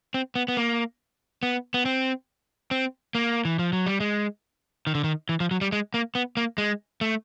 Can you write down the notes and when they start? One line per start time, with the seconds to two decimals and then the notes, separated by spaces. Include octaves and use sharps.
0.14 C4
0.35 B3
0.48 B3
0.57 A#3
1.43 B3
1.74 B3
1.85 C4
2.71 C4
3.15 A#3
3.45 E3
3.59 F3
3.73 F#3
3.86 G3
4.00 G#3
4.87 D#3
4.95 D3
5.04 D#3
5.29 E3
5.40 F3
5.51 F#3
5.61 G3
5.72 G#3
5.94 A#3
6.15 B3
6.37 A#3
6.58 G#3
7.01 A3